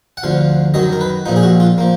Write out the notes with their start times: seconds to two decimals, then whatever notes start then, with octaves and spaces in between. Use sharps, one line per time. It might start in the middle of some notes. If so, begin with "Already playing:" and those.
0.17 F#5
0.23 D2 D3 F3 F5
0.74 F#2 D#3 F#3 D#5
0.93 A#4
1.01 B4
1.26 A#1 A#2 F3 D#4
1.36 G#4
1.43 F#4
1.60 F4
1.78 F3 A#3